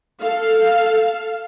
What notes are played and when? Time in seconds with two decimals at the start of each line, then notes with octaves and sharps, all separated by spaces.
0.22 A4 F5